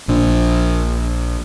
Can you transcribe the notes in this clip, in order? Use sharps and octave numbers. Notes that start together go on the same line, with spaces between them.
A#1 D4